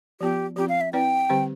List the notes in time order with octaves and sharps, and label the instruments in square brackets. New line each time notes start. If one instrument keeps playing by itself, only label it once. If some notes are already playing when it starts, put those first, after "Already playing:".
[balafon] F3 B3 F4 [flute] G4
[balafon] F3 C4 F4 [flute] G4
[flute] F5
E5
[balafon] C4 E4 B4 D5 [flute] G5
[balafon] D3 G3 C4 G4 C5